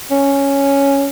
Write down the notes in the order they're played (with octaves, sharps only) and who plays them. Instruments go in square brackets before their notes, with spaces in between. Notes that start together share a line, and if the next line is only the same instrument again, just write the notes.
[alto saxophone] C#4